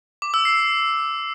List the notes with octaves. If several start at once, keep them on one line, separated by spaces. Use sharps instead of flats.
D6
E6
C7